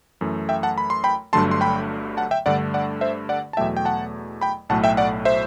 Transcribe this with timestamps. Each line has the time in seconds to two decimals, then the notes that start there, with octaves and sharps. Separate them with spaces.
0.21 F#2 E3 A3
0.49 E5 G5
0.63 F#5 A5
0.78 B5
0.90 C6
1.04 G5 B5
1.33 G1 G2 D3 F#3 A3 A5 C6
1.51 C6
1.61 G5 B5
2.17 F#5 A5
2.31 E5 G5
2.46 G2 D3 A3 D5 F#5
2.74 D5 F#5
3.01 C5 E5
3.29 D5 F#5
3.53 A5
3.57 E2 B2 F#3 A3 E5 G5
3.77 G5
3.85 F#5 A5
4.41 G5 B5
4.69 B1 A2 F#3 A3 F#5 A5
4.84 E5 G5
4.97 D5 F#5
5.25 C5 E5